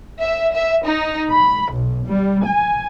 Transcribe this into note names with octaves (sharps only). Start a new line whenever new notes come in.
E5
E5
D#4
B5
B1
G3
G#5